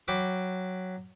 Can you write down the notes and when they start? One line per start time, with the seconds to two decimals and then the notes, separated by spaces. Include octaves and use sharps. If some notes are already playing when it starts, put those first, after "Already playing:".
0.08 F#3 G5 B5 D6